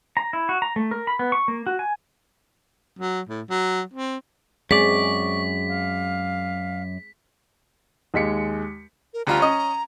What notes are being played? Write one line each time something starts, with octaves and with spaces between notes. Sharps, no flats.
A#5
E4
F#4
A#5
A3
A#4
B5
B3
C#6
A#3
F#4
G#5
F#3
A2
F#3
C4
F#2 G#3 C4 G#4 D5 C#6 B6
F5
D#2 G#3 B6 C#7
A#4
D2 G3 F4 A#5
C#4 D#5